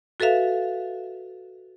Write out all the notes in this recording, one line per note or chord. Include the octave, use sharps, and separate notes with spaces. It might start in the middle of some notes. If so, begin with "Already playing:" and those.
F#4 A4 B4 E5 F5